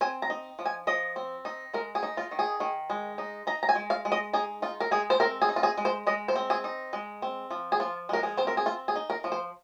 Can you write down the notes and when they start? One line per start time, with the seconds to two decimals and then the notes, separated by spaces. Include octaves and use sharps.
0.01 C4 G#5
0.22 A#5
0.30 D#4
0.59 F3
0.65 G#5
0.87 F3 D#5
1.16 C4
1.45 D#4
1.74 G#3 A#4
1.95 G#4
2.03 D#4
2.17 F4
2.31 D#3
2.39 G#4
2.60 D#3
2.90 G#3
3.18 D#4
3.47 D#4 A#5
3.63 A#5
3.69 G#5
3.75 G#3
3.90 F5
4.05 G#3
4.12 D#5
4.33 D#4 G#4
4.62 D#4 F4
4.80 A#4
4.91 G#3 G#4
5.10 C5
5.20 C4 A#4
5.42 G#4
5.49 D#4
5.56 F4
5.63 G#4
5.78 G#3
5.85 C5
6.07 G#3 D#5
6.28 C5
6.35 C4
6.50 G#4
6.64 D#4
6.93 G#3
7.22 C4
7.51 F3
7.72 G#4
7.80 F3 F4
8.09 G#3 A#4
8.23 G#4
8.37 C4 C5
8.47 A#4
8.57 G#4
8.66 C4 F4
8.88 G#4
8.96 D#4
9.10 A#4
9.24 F3
9.32 C5